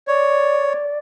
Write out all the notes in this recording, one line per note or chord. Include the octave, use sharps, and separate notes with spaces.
C#5 D5